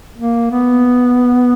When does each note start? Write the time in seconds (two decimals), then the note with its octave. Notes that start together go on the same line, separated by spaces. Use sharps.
0.16 A#3
0.51 B3